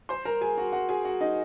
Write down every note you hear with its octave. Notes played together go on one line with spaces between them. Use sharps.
C5 C6
A#4 A#5
G#4 G#5
F#4 F#5
F#4 F#5
G#4 G#5
F#4 F#5
D#4 D#5